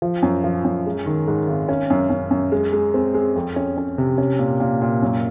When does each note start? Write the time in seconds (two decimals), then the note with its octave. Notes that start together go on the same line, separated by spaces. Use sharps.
0.02 F3
0.23 F#2
0.44 F3
0.65 F#2
0.86 G#3
1.06 D#3
1.27 G#2
1.47 G#1
1.69 C#4
1.90 F#2
2.10 F#2
2.31 F#2
2.52 G#3
2.73 G#3
2.94 C4
3.14 G#3
3.36 F2
3.56 C#4
3.78 C#4
3.98 C3
4.18 C#4
4.39 A#2
4.60 A#2
4.82 A#2
5.02 F#2